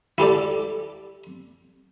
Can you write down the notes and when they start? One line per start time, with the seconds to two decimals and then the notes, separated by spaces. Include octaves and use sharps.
0.18 E4 G4 A4 D5